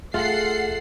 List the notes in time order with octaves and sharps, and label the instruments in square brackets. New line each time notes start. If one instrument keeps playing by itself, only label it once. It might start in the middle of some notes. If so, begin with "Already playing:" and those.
[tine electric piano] A3 G#4 E5 [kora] F4 [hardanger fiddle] A4 [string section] F#5 C7